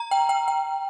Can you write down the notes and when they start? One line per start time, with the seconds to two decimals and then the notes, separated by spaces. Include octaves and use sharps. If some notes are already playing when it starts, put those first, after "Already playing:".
Already playing: A#5
0.11 G5
0.29 G5
0.48 G5